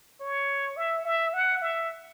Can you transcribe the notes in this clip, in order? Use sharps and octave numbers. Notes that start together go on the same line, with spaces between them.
C#5
E5
E5
F#5
E5